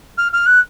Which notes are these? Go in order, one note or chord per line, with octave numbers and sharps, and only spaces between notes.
F6
F6
F#6